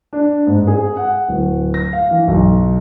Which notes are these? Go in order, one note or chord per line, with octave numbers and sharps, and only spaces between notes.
D4
G#2
G#4
F#5
D1
A#6
F5
E3
B1